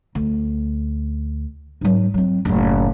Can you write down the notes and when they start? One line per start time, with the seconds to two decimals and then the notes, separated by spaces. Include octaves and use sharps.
0.15 D2
1.81 G#2 F#3
2.14 F#3 C4
2.45 F#1 A2